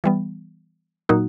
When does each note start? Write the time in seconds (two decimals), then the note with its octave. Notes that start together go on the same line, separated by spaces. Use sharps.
0.04 E3 G3 B3
1.09 A#2 F#3 A#3 D#4 F#4